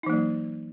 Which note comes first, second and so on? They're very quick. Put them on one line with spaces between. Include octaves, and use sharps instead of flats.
D#4 E3 A#3 F#3